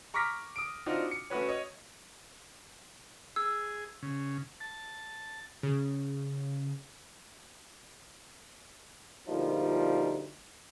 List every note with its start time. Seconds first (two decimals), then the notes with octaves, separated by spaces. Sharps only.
0.14 A#5 C#6 D6 F6 A#6 B6
0.56 D#6 D7
0.86 C4 D4 D#4 F4 F#4
1.11 C#7
1.30 A3 C#4 F#4 B4 C#5
1.48 C#5 D#5
3.36 G#4 E6
4.03 C#3
4.60 A5
5.63 C#3
9.28 D2 A#2 F3 G3 D#4